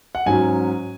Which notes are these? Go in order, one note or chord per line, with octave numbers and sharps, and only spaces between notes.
F#5
G#2 F#3 C#4 G#5